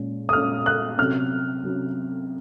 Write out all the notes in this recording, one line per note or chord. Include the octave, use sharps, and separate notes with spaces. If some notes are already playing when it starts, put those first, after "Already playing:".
Already playing: A#2 G#3 C#4
D#6
A#2 G#3 C#4 F6
F#6
C3 F#3 C#4 F6
C3 F#3 C#4